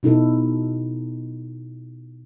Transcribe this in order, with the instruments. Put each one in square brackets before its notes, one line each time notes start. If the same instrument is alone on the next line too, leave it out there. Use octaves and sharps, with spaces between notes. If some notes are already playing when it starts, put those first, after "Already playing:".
[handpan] B2 D#4 E4 A4